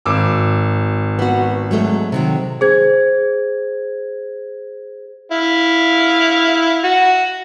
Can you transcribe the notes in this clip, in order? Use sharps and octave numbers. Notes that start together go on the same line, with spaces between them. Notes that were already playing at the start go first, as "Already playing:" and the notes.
G#1 D6 E6
B3 F#4
F#3 G#3 A3
C3 D#3 F#3
G#4 C5 G#6
E4 F5
F#4